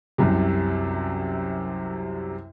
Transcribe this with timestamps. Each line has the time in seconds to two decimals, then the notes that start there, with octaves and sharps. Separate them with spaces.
0.18 C2 F#2 C3